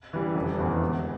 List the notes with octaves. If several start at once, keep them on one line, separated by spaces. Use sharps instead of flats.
E3 G3
F1
E2 E3
E1